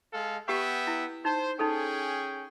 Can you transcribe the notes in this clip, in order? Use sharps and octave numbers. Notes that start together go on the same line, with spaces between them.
G#3 A4 F5
B3 G4 E5 G5 C#6
E4
D#4 C5
C#4 D#4 G#4 A4 G5